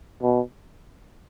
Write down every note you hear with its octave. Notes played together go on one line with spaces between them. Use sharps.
B2